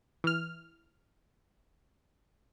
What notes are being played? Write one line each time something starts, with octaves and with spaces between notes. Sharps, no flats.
E3 F6